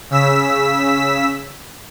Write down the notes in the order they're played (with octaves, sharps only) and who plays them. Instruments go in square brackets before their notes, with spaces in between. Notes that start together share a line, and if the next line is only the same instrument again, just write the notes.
[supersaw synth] C#3 E6 B6